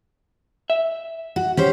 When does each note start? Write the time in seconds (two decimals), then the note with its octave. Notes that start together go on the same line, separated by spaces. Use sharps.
0.70 E5
1.36 F#4
1.57 C#4 G4 C5